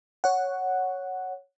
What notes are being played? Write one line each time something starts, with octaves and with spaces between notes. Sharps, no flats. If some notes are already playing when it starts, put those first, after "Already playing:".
C#5 F#5